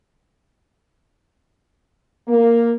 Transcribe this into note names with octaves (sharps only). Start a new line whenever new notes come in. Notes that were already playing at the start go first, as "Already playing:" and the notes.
A#3